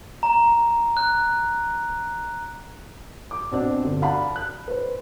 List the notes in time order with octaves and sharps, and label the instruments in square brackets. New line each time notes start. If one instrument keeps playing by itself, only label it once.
[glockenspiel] A#5
F#6
[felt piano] D6
B2 C4 D4
G1
D5 F5 F#5 A5 B5
F#6
B4 C5